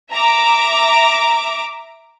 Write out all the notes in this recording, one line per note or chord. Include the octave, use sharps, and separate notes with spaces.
E5 A#5 D6